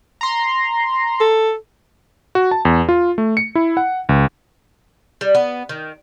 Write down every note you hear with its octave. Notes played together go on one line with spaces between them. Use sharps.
A#5 C6
A4
F#4
A5
E2
F4
A3
C#7
E4
F#5
C#2
G3
B3
D#3